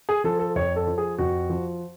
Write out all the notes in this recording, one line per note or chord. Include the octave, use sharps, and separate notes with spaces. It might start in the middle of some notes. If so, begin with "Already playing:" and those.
G#4
F3 A4
A4
F2 C#5
A4
F3
G#4
F2 F#4
F3